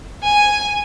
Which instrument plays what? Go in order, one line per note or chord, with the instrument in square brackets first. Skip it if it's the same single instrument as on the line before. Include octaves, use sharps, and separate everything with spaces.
[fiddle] G#5